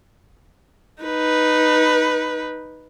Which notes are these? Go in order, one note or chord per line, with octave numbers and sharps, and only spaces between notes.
D#4 B4